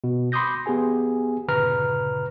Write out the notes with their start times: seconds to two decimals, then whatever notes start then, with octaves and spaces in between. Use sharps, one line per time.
0.04 B2
0.32 B5 C6 D6 D#6 G6 A#6
0.66 B3 G4 G#4 G#5
1.48 G1 A#2 C#3 B4 A#5 F6